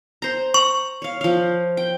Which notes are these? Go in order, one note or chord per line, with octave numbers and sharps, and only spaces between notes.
C5 A#5
A#5 C#6
C#5 F5
F3 F5
G5